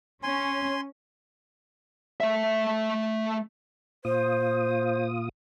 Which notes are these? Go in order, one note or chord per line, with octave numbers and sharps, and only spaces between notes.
C#4 G#5 C6
A3 E5
A#2 F4 C5 D#6